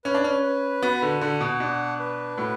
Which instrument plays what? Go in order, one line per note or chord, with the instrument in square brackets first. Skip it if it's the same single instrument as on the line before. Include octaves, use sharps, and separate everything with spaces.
[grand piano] C#4 [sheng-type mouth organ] B4
[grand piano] D4
C#4
[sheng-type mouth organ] B4
[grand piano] B3 [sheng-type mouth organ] F#4
[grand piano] D3
[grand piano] D3 [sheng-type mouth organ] F#5
[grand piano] B2
[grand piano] B2 [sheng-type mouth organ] D4
[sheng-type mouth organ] B4
[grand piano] A2 [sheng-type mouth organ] F#4